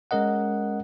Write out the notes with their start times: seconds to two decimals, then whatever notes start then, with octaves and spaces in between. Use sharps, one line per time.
0.11 G#3 C#4 A#4 D#5 F#5